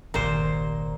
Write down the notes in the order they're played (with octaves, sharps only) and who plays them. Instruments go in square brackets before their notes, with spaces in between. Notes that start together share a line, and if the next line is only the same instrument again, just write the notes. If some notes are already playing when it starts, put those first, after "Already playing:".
[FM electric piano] G1 C2 A#5 [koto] A#2 C5 [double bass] D#3